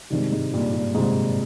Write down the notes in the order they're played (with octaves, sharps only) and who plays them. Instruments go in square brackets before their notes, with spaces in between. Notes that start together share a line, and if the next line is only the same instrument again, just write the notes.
[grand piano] G2 [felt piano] C3 D#3 G#3 C4
[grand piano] G#2
G2 A#2
G2
[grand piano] G#2 [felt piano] C3 D#3 G#3 C4